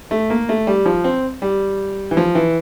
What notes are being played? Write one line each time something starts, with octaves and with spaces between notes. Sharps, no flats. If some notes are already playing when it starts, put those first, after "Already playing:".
A3
A#3
A3
G3
F3
C4
G3
E3
F3
E3